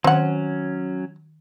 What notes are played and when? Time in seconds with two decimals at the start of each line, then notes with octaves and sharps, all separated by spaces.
0.04 D#3 F#3 C4 C#4 F#5